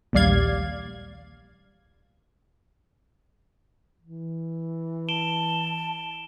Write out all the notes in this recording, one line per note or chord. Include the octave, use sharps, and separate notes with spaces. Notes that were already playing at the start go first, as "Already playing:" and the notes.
A#1 D#2 G3 D5 F5 G#6
E3
A5 D7 E7 G7